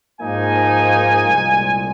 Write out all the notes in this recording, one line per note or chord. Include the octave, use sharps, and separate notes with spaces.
G#2 F3 A#3 D#4 G#5
C2 A#2 G#3